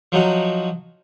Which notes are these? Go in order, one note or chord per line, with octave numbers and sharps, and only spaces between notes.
F3 F#3 D#4 F#4